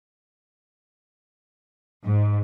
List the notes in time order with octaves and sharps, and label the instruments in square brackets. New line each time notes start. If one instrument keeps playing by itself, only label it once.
[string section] G#2